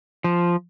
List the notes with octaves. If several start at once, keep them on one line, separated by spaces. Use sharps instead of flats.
F3